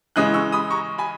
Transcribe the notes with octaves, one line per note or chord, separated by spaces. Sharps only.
C#3 E3 G#3 C#4 D#6 F#6
C#6 E6
B5 D#6
A#5 C#6
G#5 B5